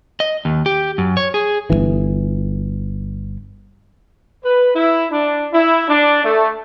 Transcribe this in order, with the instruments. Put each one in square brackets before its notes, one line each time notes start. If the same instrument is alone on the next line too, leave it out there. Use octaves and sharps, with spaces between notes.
[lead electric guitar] D#5
D#2
G4
F#2
C#5
G#4
[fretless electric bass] G1 C#2 E3
[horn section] B4
E4
D4
E4
D4
A3